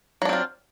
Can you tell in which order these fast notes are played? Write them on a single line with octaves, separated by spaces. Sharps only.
F#3 D4 C4 F4